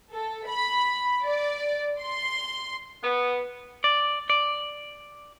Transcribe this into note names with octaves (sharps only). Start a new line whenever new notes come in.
A4
B5
D5
C6
B3
D5
D5